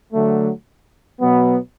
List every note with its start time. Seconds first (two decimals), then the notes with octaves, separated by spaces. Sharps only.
0.13 D3 F#3 A3
1.20 B2 F#3 B3